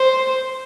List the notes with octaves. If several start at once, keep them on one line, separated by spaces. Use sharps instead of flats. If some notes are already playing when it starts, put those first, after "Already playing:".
Already playing: C5